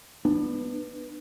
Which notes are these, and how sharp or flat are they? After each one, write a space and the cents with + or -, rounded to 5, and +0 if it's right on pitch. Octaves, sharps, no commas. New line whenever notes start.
B3 +0 D4 +30